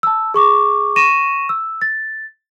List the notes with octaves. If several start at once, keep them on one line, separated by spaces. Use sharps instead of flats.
A5 E6
G#4 C#6 D6
C#6 A#6 D#7 E7
E6
A6